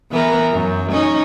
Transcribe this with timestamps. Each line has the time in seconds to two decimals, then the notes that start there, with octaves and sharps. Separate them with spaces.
0.12 E3 B3 A#4
0.52 F#2
0.91 C#4 D#4 D#5